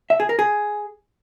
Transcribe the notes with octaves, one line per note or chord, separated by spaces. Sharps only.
E5
G#4
A#4
G#4